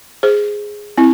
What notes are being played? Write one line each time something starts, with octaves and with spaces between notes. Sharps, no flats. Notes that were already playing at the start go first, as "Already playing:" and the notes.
G#4 C5
C4 E4